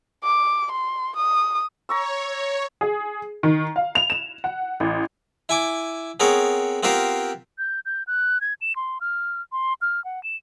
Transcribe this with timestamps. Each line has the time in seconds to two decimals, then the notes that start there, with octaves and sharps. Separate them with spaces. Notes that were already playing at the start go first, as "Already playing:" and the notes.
0.23 D6
0.71 C6
1.16 D#6
1.89 C#5 A#5 C#6 E6
2.81 G#4
3.43 D#3
3.76 F5
3.95 F7
4.10 E7
4.44 F#5
4.80 A1
5.49 E4 G#5 D6
6.20 B3 C4 G#4 A#4 C#5
6.83 B3 C4 F4 G4 A#4 C5
7.58 G6
7.86 G6
8.07 F#6
8.41 G#6
8.61 E7
8.76 C6
9.01 F6
9.52 C6
9.82 F6
10.05 F#5
10.23 E7